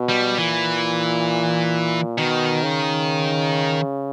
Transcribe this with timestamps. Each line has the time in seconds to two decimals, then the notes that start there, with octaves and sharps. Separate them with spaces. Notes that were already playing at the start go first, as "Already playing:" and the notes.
Already playing: B2
0.09 G3
0.38 A#2 E3
2.18 B2 D#3
2.63 C#3